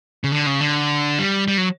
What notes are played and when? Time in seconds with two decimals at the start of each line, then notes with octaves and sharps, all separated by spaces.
0.24 C#3
0.32 D3
0.47 C#3
0.61 D3
1.19 G3
1.48 G3
1.58 F#3